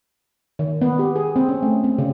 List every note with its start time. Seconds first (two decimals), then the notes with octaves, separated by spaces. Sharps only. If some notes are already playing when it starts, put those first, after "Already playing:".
0.59 D#3
0.81 B3
0.99 G4
1.16 G#4
1.36 C4
1.49 C#4
1.63 A3
1.84 C4
1.98 C#3